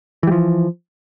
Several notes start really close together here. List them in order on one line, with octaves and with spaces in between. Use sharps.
E3 G3 F3